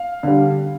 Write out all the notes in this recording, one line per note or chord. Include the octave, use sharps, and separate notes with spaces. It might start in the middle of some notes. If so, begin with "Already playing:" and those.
Already playing: F5
D3 G3